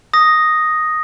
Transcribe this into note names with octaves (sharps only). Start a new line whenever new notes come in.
D#6 A#6